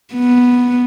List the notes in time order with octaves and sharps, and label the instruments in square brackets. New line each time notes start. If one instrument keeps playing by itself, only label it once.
[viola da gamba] B3